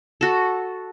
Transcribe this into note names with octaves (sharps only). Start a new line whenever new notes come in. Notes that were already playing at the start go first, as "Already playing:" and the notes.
F#4 A4